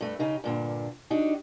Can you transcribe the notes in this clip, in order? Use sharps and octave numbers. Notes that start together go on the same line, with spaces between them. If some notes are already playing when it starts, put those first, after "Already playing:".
G2 A3
C#3 D#4 G4
G2 A#2 D3
D4 D#4 F#4 G4